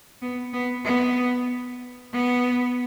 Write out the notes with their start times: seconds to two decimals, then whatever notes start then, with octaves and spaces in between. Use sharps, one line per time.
0.22 B3
0.53 B3
0.85 B3
2.13 B3